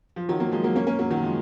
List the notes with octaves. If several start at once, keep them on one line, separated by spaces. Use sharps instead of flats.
F3
D#3 F#3
F#3 A#3
F3 G#3
F#3 A#3
A#3 C#4
A#3 C#4
F#3 A#3
D#3 F#3
F3 G#3